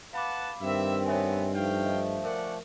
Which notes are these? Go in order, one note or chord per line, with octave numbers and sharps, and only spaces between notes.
B4 F5 F#5 A5 B5 D6
G2 D#3 C4 E5
A3 B3 C#5 E5 G#5
F3 A3 D#4 F5 G5
D#5
C#4 A#4 D5 F#5